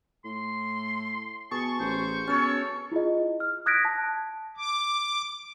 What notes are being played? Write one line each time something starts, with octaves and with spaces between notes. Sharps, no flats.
A2 C6
B2 G#4 A5 C#6
A1 C5
B2 C#4 A4 C#5
E4 F4 G#4 D#5
F6
D#6 F#6 G#6 A#6 B6 D7
A5
D6